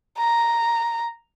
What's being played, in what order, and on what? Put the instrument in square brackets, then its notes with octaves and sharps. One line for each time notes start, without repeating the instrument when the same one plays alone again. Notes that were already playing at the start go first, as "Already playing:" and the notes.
[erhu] A#5